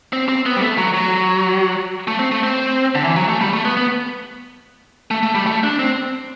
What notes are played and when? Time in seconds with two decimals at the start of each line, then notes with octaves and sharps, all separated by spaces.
0.13 C4
0.29 C4
0.46 B3
0.56 G3
0.61 A3
0.78 F#3
0.94 F#3
2.08 A3
2.19 C4
2.32 A3
2.43 C4
2.95 D3
3.05 E3
3.16 F#3
3.29 A3
3.41 G3
3.53 A3
3.65 B3
3.77 B3
5.11 A3
5.23 A3
5.35 G3
5.47 A3
5.64 D4
5.79 C4